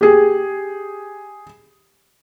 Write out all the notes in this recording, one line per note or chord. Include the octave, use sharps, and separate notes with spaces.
G4 G#4